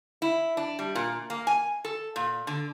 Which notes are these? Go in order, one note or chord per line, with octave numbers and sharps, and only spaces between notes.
E4
D4
G3
A#2
A#3
G#5
A4
A#2
D3